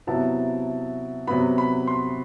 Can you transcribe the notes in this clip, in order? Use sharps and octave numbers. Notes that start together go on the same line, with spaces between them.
C3 F#3 B3 E4 A5
C3 F#3 B3 B5
B5
C6